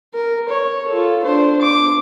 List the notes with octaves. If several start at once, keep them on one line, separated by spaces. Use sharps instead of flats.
A#4
C#5
F4 A4
D4 C5
D6